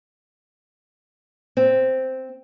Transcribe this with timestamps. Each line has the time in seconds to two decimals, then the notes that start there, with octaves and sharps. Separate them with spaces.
1.57 C4